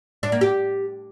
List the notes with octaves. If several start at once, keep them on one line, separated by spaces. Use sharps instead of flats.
D4
A#3
G4